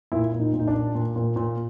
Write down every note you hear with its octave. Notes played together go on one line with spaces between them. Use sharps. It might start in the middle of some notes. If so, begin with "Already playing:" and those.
A#2 E4
A#2
D#4
A#2
D#4
D4
A#2
A#2
A#2
A#2